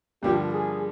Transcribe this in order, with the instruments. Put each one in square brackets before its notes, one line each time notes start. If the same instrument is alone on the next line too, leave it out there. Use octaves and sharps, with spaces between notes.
[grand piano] G2 D3 F3 A#3 [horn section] G4
[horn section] G#4